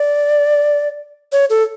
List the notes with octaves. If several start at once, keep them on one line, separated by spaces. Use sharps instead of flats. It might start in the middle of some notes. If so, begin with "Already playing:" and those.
Already playing: D5
C#5
A4